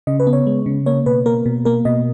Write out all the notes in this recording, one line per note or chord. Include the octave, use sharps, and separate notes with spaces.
C#3 D#5
B4
B3
C#5
G#3
C#3
A#3 C#5
B2 B4
A#3 A#4
B2
A#3 A#4
B2 D#5